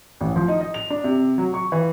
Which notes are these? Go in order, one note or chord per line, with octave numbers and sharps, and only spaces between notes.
A1
F3
D#4
D#5
F7
D4
C3
F#3
C#6
E3